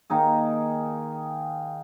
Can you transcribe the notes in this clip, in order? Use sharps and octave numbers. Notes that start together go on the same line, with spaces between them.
D#3 A#3 D#4 G#4